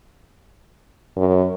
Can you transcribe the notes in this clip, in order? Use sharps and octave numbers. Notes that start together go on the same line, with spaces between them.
F#2